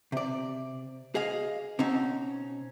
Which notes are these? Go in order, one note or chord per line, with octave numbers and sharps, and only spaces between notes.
C3 D5
G#4 D#5 F5
B2 C4 C#4 D#4